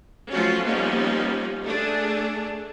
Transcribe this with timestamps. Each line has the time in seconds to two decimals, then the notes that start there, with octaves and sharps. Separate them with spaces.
0.30 F3 F#3 A3 C#4 F4 F#4
0.65 F3 G3 A#3 B3 C#4 D#4
1.65 A3 D4 G#4